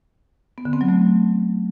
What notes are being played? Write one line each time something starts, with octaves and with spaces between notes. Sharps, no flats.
B3
D3
C4
F#3
A3